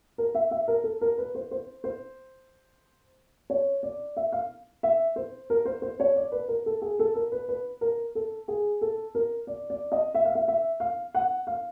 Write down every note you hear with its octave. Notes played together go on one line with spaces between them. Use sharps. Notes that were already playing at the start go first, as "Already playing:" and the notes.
A#4
E5
E5
A#4
A4
A#4
B4
C5
C5
C5
C#5
D5
E5
F5
E5
C5
A#4
C5
C5
C#5
D5
B4
A#4
A4
G#4
A4
A#4
B4
B4
A#4
A4
G#4
A4
A#4
D5
D5
D#5
E5
F5
E5
E5
F5
F#5
F5